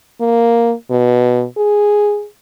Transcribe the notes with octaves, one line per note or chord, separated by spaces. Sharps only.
A#3
B2
G#4